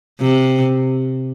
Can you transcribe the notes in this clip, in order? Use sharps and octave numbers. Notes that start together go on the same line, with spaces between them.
C3